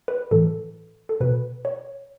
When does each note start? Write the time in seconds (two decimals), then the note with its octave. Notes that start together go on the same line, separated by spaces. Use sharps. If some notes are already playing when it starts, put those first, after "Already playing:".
0.08 B4
0.31 A2 E3 A4
1.09 A4
1.21 B2 B4
1.65 C#5